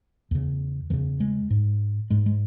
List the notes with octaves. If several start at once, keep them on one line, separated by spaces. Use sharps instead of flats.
E2 C#3
E2 C#3 E3
G#3
G#2
G#2 G#3
G#3